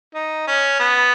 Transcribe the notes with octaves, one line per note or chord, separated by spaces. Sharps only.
D#4
C#4
B3